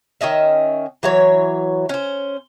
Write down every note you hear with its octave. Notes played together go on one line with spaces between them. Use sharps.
D#3 C#4 D#5 E5
E3 F#3 C#5
C#4 C5